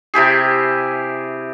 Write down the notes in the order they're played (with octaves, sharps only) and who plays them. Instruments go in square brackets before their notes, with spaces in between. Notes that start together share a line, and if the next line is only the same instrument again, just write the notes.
[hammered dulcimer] C3 E4 G4 G#4